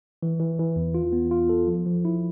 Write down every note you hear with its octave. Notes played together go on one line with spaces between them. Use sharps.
E3
E3
E3
E2
F4
B3
F4
A4
F3
F3
E4